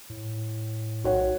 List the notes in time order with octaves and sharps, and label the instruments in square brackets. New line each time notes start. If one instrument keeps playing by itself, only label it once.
[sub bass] A2
[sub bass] B1 [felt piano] F#4 C#5 F#5